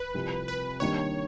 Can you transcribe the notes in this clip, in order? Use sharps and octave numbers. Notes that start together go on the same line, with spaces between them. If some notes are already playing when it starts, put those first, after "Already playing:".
Already playing: B4
C2 C3 F3
B4
D#3 G3 A#3 D4 G4 C#5